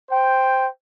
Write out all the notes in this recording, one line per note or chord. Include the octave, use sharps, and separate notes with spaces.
C5 G5